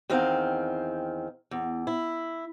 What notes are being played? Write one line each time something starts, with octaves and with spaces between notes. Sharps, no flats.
E2 D#3 C4 F5
E2
E4